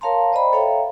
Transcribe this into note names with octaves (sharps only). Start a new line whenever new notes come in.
A#4 C#5 F5 A5 A#5 C6
C5 D5 D#5 G5 A#5 B5
A4 C#5 E5 F5 G5 A#5